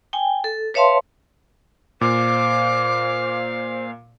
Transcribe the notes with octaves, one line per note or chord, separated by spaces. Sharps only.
G5 G#5
A4
B4 C#5 E5 F5 A5 C6
A#2 C5 F5 D6